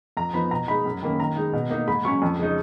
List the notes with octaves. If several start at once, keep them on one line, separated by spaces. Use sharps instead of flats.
F2 A#5
F3 B3 D#4 B5
B2 A#5
G#3 D#4 B5
F#2
D#3 A#3 C#4
D#3 A#5
G#3 D#4
B2
A#3 D#4
G#2 B5
F#3 C#4 C#6
F2
C#3 G#3 D#4